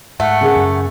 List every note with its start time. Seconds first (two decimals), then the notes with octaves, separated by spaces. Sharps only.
0.20 G#2 A3 F#5
0.41 C#3 A#3 G#4
0.56 F#2